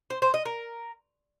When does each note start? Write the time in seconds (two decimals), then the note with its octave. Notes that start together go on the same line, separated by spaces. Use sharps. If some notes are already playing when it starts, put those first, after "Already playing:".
0.10 C5
0.22 C5
0.34 D#5
0.45 A#4